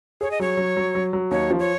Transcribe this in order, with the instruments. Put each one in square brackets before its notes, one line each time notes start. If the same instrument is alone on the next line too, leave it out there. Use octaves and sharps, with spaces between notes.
[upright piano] G#4 [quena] C#5
[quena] D#5
[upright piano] F#3 [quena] C#5
[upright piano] F#3
F#3
F#3
F#3
[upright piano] D#2 [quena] C#5
[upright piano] F3
[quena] C#5